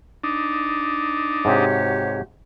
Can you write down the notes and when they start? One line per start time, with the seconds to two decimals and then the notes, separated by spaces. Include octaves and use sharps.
0.24 D4 D#4
1.45 G#2 C3 F#4 G4 C#5